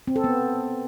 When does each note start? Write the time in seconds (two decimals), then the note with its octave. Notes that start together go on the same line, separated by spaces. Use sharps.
0.08 C4
0.16 A4
0.24 B3